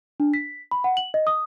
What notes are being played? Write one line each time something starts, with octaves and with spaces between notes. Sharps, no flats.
D4
B6
B5
F#5
F#7
D#5
D#6